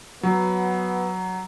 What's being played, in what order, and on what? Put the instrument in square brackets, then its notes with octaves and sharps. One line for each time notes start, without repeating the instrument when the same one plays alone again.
[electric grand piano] F#3 [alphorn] B3